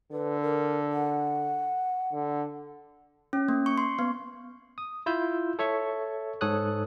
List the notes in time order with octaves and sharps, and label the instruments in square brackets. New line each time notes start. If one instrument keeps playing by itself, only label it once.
[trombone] D3 [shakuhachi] B4
[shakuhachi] A#4
F#5
[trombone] D3
[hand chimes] C#4
A#3
C#6
C6
B3
[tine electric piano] D#6
E4 F4 E6 G6
A4 C#5 E5 C#6
G#2 A4 C#5 D#6 F#6